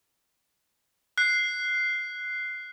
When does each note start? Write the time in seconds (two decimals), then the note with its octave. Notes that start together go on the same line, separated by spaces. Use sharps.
1.18 F#6 C7